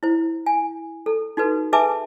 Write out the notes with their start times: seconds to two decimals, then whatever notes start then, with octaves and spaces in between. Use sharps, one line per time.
0.03 E4 C5
0.46 G#5
1.06 A4
1.37 D#4 F#4 A4 B4
1.73 G#4 B4 E5 G#5 A5 D6